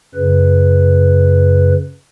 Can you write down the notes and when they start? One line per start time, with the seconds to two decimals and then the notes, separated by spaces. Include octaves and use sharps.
0.15 F#2 C#3 B4